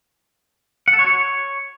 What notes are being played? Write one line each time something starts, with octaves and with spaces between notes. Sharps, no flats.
F#5
A4
C#5
F#4
C#5